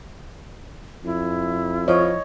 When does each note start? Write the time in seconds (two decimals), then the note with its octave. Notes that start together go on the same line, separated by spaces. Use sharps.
1.04 F2 E4
1.88 F3 C#5 D#5